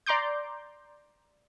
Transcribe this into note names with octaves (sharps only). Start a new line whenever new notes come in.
D5 A#5 C6 D6 G6